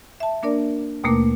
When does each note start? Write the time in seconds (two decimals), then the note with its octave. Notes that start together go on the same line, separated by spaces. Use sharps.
0.20 E5 A5
0.43 A#3 D4 A#4 D5
1.04 D#2 B2 A3 A#3 A#4 D6